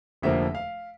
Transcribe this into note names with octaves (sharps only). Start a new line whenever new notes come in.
F1 F2 D3 F3 A#3 E5
F5